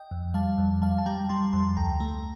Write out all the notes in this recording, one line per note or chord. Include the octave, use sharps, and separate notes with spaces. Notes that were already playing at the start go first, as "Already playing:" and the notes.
Already playing: D#5 G5
F2
G3 F5 A5
F2
G3 F5 A5
A5
G3 G5 A#5
G3 A5 C6
F2 A5 C6
D2 G5 A#5
A3